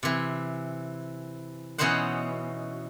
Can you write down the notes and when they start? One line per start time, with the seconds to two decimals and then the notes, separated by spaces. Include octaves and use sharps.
0.03 C3 E3
1.78 B2 E3 C#4 D#4 C5 F#5